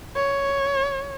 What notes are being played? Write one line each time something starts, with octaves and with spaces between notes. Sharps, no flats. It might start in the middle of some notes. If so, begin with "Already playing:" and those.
C#5